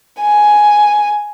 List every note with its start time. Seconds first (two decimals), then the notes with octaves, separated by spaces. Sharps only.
0.21 G#5